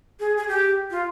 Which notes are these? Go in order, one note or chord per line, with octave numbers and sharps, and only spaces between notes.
G#4
G#4
G4
F4